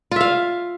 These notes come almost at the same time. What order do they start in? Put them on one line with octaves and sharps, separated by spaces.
F4 E5 F5